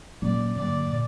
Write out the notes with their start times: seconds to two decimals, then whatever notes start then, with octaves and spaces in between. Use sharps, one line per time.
0.22 A#2 F#3 A#3 C#4 D5
0.56 G2 D3 F#3 A#3 D5
0.91 A#2